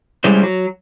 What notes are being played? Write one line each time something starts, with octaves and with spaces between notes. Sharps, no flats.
G3 G#3 C#4 E4 C5
F#3